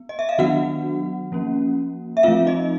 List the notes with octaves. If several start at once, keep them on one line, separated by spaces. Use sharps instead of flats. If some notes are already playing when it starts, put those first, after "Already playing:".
Already playing: B3
D#5
E5
F5
D#3 F#3 B3 D4 F#4 F#5
F3 A#3 C#4
E5
F3 A3 C4 F4 F5
D#4 D#5